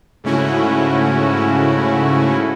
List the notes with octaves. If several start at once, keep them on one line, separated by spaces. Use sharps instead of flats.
G#2 C#3 A3 C#4 E4 F#4